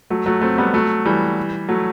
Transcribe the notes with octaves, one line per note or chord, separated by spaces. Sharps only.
F#3 A3
F#3 A3
A3 C4
G3 B3
F#3 A3
E3 G3
F#3 A3